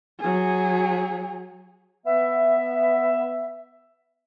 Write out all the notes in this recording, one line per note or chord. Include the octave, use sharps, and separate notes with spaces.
F#3 G#4
B3 E5